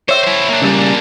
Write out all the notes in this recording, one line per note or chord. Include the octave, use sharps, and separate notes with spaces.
C5 C#5 E5
E4 C5
A#3 D4
C#3 G3